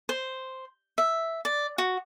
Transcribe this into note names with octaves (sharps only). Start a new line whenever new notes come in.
C5
E5
D5
F#4